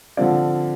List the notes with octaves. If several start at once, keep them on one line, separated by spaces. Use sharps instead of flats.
D3 F3 C4 D5 F5